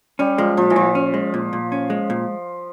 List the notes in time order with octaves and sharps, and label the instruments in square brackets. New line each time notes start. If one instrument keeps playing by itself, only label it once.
[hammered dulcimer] G3 [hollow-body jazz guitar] C#4
[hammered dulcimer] F3 [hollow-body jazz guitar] G#3
[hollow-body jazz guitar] A#2 [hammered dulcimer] F3
[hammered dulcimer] E3
[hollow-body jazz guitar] A#2 [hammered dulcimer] F3
[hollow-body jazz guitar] C#4
G#3
A#2
A#2
C#4
G#3
A#2